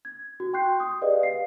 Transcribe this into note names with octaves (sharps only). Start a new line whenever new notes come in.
G#6
F#4
G5 C6 C#6 F#6 G6 C7
D#6
G4 G#4 B4 D5 D#5 F5
F5 C7